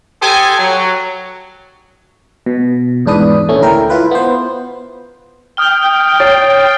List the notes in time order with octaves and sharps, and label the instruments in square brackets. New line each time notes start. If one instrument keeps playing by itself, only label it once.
[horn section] G4 A4 C5 D#5 G#5
F#3
[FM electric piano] B2
E2 G#2 D4 B4 D#6
A#2 A3 C#4
D2 E4 A#4 G5
E4 F4 B4
B3 C5
[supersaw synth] G5 [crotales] D#6 F6 G7
[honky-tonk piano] C#5 [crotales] A6 C7